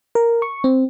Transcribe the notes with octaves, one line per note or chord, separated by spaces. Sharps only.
A#4
C#6
C4